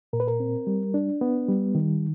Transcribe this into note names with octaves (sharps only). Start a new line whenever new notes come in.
A#2 A#4
B4
A#4
C4
G3
D4
B3
G3
D#3